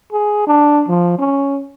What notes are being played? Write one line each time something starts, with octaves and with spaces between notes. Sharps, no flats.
G#4
D4
F3
C#4